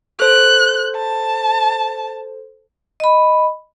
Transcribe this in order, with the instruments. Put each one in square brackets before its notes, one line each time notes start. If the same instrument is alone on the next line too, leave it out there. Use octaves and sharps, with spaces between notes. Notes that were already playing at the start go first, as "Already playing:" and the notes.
[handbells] A4 C5 [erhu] F#6
[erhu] A5
[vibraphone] D#5 B5